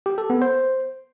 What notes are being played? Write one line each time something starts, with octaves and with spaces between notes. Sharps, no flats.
G4
A4
B3
C5